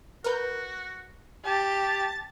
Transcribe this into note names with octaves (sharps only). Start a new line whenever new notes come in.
F#4 A#4 B4 G6
G4 A5